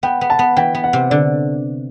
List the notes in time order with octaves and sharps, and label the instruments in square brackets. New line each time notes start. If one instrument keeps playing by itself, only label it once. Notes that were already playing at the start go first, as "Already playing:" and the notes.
[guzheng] B3 [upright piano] G5
[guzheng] B3
[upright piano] A5
[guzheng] B3
[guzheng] E3 [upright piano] G5
[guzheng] B3
[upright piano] F#5
[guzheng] C3
[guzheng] D3 [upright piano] D5